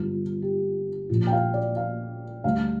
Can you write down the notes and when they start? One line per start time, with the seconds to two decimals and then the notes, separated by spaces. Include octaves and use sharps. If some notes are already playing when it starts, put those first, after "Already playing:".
Already playing: G1 G2 G3 F4
0.42 G4
1.09 A#1 A#2 F3 F4
1.27 G5
1.32 F5
1.54 D5
1.76 F5
2.44 D2 D3 G3 F5